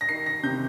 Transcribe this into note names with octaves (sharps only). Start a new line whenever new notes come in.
A#6
D#3 C7
A#6
C3 G6